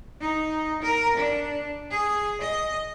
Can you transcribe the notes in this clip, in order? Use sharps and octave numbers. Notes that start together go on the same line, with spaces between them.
D#4
A#4
D4
G#4
D#5